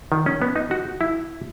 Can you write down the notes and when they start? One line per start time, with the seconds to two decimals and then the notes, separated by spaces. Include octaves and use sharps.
0.12 D#3
0.26 C#4
0.42 B3
0.56 D#4
0.71 F#4
1.01 E4